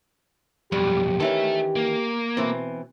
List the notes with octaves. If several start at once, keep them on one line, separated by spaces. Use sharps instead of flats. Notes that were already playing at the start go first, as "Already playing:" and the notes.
B1 F2 G3 G4
D#3 E3 C#4 A4 E5
A#3
B2 E3 C4